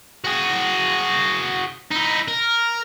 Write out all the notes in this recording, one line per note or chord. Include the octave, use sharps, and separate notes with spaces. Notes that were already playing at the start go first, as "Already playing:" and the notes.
F#4 G#4
D#4 E4
A#4